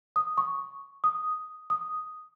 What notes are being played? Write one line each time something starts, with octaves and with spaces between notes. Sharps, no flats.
D#6
C#6
D#6
D#6